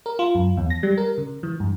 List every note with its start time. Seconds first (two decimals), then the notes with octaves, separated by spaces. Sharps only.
0.06 A#4
0.19 F4
0.35 F#2
0.57 E2
0.70 A#6
0.83 G3
0.98 A#4
1.18 C#3
1.43 E3
1.60 G2